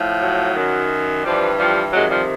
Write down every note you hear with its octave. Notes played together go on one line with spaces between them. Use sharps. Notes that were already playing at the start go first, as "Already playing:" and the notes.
Already playing: A2 F3
F#3
F#2 D#3
G2 E3 F3 G3
F3 G3
F2 C3 D#3 F#3 G#3
F3 G3